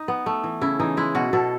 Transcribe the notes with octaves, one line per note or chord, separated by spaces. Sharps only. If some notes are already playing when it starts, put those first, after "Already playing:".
Already playing: D#4
B3
A3
E3
C#3 E4
E3 D#4
G#3 E4
B2 F#4
B2 A4